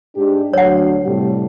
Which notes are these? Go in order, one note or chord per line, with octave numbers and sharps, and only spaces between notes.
G#2 D4 G4
D2 F#3 C#5 F#5
A2 C3 G3